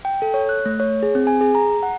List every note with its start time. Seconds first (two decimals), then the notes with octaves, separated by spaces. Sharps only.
0.05 G5
0.22 A4
0.34 C#5
0.49 F#6
0.66 A3
0.80 C#5
1.03 G#4
1.15 C4
1.27 G#5
1.41 G#4
1.55 A#5
1.83 F#5